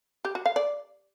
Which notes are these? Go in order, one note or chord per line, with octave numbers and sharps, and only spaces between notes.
G4
F#4
F5
D5